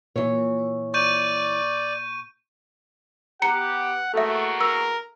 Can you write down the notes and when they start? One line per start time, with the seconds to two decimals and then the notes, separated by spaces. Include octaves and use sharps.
0.16 A#2 E3 C#5
0.94 D5 C#6 G6 D#7
3.42 B3 G4 F#5 A#5 C#7
4.14 E2 A3 A#3 F#4 A4 E5
4.61 A#4 E6